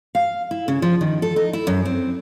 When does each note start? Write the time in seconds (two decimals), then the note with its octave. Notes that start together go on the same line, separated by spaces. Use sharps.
0.15 F5
0.51 E4
0.68 C#3
0.82 F3
1.01 D#3
1.22 A4
1.36 D#4
1.53 E4
1.67 F#2
1.85 C4